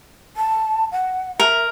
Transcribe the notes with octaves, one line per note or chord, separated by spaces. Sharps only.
A5
F#5
A#4 E5